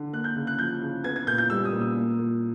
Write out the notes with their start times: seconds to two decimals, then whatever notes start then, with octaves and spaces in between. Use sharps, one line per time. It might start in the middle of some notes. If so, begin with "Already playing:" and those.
Already playing: D3
0.13 A#3 F#6
0.24 G6
0.36 C#3
0.47 F#6
0.58 F3 G6
0.81 C#3
1.04 B3 G#6
1.16 G#6
1.27 A#2 G6
1.38 G6
1.50 G3 E6
1.65 D#6
1.73 A#2
1.81 E6
1.96 A#3
2.19 A#2